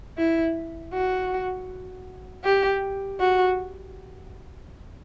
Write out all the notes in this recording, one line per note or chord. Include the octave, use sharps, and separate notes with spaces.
E4
F#4
G4
F#4